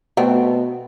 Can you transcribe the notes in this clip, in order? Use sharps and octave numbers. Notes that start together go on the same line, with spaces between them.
B2 A3 B3 C4